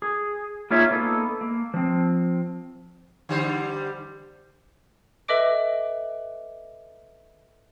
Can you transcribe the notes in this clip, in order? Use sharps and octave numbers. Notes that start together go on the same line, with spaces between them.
G#4
A#3 D#4 F4 G#4 C#5 E5
A#3 B3 D#4 A4
A#3
F3 C4
D3 G3 C5
A4 B4 D#5 E5 D6 D7